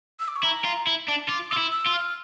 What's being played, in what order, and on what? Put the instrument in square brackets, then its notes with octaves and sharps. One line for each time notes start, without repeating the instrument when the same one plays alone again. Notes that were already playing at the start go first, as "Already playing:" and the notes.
[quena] E6
D6
C#6
[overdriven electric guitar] E4 [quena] A#5
[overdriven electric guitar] F4
E4
D4
[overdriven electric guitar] F4 [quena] D6
[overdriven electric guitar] F4 [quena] E6
[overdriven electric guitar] E4
[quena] E6
[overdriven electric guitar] F4
[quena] F6